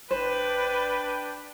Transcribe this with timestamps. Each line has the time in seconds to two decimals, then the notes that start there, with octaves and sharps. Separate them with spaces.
0.11 G1 D4 B4 C5 G5